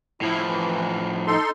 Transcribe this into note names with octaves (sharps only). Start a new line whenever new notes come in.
A2 F3 E4
E3
D#4 A4 C6